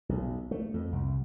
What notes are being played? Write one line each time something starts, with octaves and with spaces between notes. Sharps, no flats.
B1
A3
F2
C2